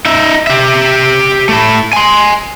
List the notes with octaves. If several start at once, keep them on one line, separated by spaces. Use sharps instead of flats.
D#4 E5
G4 E5
A3 E4
G#5 C6